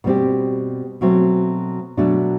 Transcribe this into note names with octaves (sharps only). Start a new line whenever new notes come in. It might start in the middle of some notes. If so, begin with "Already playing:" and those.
B2 G3 C4 G4
B2 F#3 A3 C4
B2 F#3 A3 D4